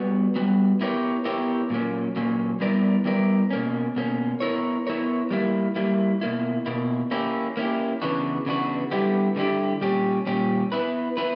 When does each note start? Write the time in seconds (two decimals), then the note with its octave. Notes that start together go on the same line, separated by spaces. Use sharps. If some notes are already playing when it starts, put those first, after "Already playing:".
Already playing: G3 B3 F#4
0.36 G3 B3 F#4
0.81 B3 E4 G4 A#4 C#5
1.25 B3 E4 G4 A#4 C#5
1.70 A#2 F#3 A#3 C#4
2.16 A#2 F#3 A#3 C#4
2.60 G3 B3 E4 A#4 D5
3.05 G3 B3 E4 A#4 D5
3.50 B2 A#3 C#4
3.96 B2 A#3 C#4
4.40 B3 E4 A#4 C#5
4.87 B3 E4 A#4 C#5
5.31 G3 A#3 E4
5.76 G3 A#3 E4
6.21 B2 A#3 E4
6.66 B2 A#3 E4
7.11 A#3 C#4 E4 G4
7.57 A#3 C#4 E4 G4
8.02 C#3 E3 B3 D4 F#4
8.46 C#3 E3 B3 D4 F#4
8.91 D3 G3 B3 E4 G4
9.36 D3 G3 B3 E4 G4
9.81 A#2 G3 C#4 G4
10.27 A#2 G3 C#4 G4
10.72 B3 E4 B4
11.17 B3 E4 B4